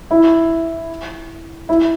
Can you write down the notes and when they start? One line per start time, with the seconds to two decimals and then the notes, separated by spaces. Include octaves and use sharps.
0.11 E4
1.69 E4